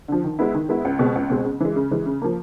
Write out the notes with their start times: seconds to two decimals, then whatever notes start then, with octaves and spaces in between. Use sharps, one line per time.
0.08 D3 F3
0.24 D#3
0.39 G#3 B3 E4
0.54 D#3
0.69 G#3 B3 E4
0.85 C#2
0.99 B2 G#3 C4
1.15 C#2
1.30 B2 G#3 C4
1.45 C#3
1.60 E3 G#3
1.76 C#3
1.91 E3 G#3
2.06 C#3
2.22 F3 A#3